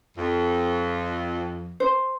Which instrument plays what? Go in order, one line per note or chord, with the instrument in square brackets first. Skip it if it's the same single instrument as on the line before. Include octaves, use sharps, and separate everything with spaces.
[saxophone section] F2
[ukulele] C5